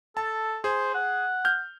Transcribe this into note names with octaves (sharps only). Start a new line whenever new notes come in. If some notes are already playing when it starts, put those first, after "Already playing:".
A4 A5
G#4 C5
F#5
F6 G6